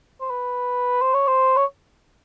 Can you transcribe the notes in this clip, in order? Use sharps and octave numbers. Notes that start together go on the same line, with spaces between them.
C5
B4
C5
C#5
C5
C#5